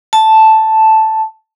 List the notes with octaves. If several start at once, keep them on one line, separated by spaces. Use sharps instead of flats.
A5